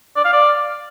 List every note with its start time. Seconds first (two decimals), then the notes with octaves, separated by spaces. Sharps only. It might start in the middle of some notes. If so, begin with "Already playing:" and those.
0.16 D5
0.25 F5
0.33 D5